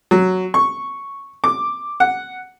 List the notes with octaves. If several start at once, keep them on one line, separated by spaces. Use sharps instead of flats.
F#3
C#6
D6
F#5